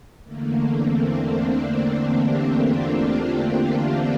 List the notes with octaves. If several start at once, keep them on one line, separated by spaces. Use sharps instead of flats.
E2 D3 A3 A#3
C4
D4
G4
F4